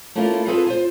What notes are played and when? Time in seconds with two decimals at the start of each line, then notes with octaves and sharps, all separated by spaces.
0.15 A3 A#3 C#4 E4 F4
0.47 B3 C4 F4 G#4 A4 B4
0.67 F4 C5